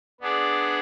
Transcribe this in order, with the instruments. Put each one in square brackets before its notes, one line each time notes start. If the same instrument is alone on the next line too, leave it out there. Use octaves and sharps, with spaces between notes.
[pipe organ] B3 D4 G#4 D5